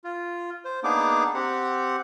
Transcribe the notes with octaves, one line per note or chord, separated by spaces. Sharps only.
F4
C5
A#3 B3 D4 D#4 G#4 D6
C4 G4 F#5